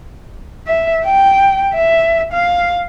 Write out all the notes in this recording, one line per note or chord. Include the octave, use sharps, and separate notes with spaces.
E5
G5
E5
F5